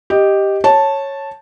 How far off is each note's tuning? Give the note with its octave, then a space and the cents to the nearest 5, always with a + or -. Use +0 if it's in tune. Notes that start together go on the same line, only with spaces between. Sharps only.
G4 +0 D#5 +0
C#5 -10 A5 +0